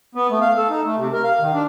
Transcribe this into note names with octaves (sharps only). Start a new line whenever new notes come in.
B3
A3
F5
A4
D#4
A3
C3
A#4
F5
D#3
D4